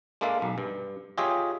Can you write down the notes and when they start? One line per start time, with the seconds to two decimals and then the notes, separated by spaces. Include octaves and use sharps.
0.21 G#3 A#3 D4 A4 E5 F5
0.42 B1
0.58 G2
1.18 F4 G4 G#4 C#5 D#5 E5